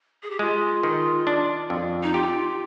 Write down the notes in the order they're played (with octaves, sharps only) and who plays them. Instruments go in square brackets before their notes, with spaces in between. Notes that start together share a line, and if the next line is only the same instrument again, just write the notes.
[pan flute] G#4
G4
[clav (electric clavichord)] G#3 [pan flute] F4
[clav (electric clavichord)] D#3
D4
F2
[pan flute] D#4
[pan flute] F4 [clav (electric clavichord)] G4